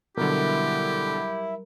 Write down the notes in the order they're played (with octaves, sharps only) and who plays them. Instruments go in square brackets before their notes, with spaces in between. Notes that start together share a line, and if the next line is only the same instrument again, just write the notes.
[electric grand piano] B2 D3 [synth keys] F#3 G3 A#4 [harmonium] E4 [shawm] G4